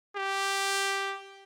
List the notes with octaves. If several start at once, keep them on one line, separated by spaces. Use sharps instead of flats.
G4